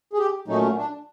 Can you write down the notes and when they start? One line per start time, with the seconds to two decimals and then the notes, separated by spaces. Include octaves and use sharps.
0.13 G#4
0.18 G4
0.48 A#2 F#3 A3 C#4 D#4
0.77 D4